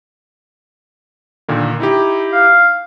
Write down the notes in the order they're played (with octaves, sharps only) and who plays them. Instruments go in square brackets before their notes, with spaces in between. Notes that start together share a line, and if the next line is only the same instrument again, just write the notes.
[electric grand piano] A#2 D3 D#3
D#4 E4 G4
[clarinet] F5